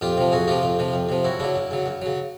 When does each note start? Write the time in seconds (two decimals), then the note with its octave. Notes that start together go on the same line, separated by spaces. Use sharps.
0.01 F2 F4 G4
0.17 C3 F3
0.32 F2 F#4 G#4
0.48 C3 F3 F4 G4
0.63 F2
0.79 C3 F3
0.94 F2
1.09 C3 F3
1.24 F#2 E4 F#4
1.40 C#3 F#3 D4 E4
1.55 F#2
1.71 C#3 F#3
1.86 F#2
2.02 C#3 F#3